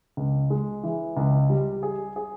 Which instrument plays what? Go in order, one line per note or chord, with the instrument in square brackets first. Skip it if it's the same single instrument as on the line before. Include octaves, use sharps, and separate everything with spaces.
[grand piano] C#2
G#3
E3
C#2
G3
G#4
G#4